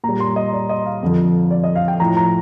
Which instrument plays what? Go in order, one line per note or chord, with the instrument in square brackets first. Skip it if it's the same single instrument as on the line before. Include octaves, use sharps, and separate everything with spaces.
[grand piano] A#2 G3 A#5
C6
D#5
D5
D#5
F5
F2 D3 F3
D5
D#5
F5
G5
A2 F3 A#5
A#5